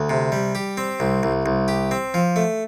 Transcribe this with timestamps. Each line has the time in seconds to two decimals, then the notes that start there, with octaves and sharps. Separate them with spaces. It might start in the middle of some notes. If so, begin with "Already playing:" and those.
Already playing: D2
0.09 C3
0.32 G3
0.55 G4
0.77 C4
1.00 C2
1.23 C2
1.46 C2
1.68 G4
1.91 C4
2.14 F3
2.36 A3